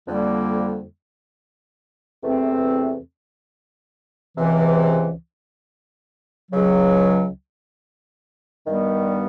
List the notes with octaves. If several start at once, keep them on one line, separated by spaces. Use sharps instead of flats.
F2 D3 G3 A#3
E2 C3 E3 A3 C4
C#2 C3 E3
C#2 C#3 F#3
G2 D#3 G3 B3